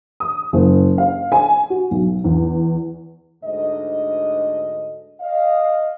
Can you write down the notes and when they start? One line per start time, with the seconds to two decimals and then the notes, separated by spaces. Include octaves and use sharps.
0.20 D#6
0.53 F#1
0.98 F5
1.32 G#5
1.70 F#4
1.91 B1
2.24 E2
3.44 D2 G#2 D3 D#5
5.21 D#5 F5